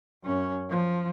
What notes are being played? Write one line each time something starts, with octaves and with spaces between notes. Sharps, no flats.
F#2 C#4
F3